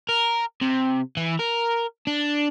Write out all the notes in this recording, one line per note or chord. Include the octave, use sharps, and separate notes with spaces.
A#4
C3
E3
A#4
D4